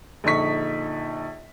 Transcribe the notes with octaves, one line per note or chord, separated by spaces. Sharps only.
A#1 D3 D#4 C#6 B6